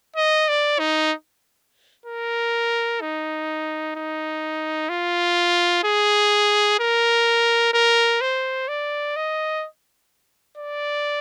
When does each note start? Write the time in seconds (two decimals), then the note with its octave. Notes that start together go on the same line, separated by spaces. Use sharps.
0.16 D#5
0.49 D5
0.79 D#4
2.06 A#4
3.01 D#4
3.96 D#4
4.89 F4
5.84 G#4
6.80 A#4
7.74 A#4
8.21 C5
8.68 D5
9.16 D#5
10.57 D5